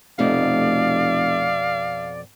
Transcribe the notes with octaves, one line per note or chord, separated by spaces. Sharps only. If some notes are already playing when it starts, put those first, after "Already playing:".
F1 F2 B2 A3 D5 F5